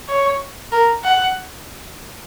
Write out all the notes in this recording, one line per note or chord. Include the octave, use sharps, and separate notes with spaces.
C#5
A#4
F#5